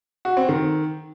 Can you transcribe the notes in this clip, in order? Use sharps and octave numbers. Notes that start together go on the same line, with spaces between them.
F#4
C4
D#3